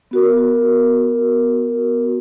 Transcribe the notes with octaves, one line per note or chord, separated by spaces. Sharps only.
B3 F#4 A#4